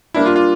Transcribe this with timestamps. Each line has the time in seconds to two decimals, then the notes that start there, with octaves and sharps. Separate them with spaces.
0.14 G3 A#3 D4 E4
0.26 F4
0.36 F4